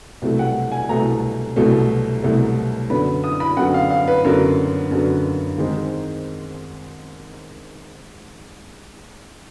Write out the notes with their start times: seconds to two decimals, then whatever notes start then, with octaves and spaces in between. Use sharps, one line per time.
0.22 C2 B2 F#3 A3
0.39 F#5
0.72 G#5
0.89 C2 B2 F#3 A3 A#5
1.56 C2 B2 F#3 A3
2.23 C2 B2 F#3 A3
2.90 F#2 D3 F#3 B3 B5
3.24 D#6
3.40 B5
3.57 F#2 D3 F#3 B3 F#5
3.74 F5
3.91 F5
4.08 B4
4.25 F#2 D3 F#3 B3 A#4
4.91 F#2 D3 F#3 B3
5.58 G#2 D#3 G#3 C4